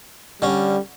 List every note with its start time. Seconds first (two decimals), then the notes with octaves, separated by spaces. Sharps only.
0.42 D3 G3 C#4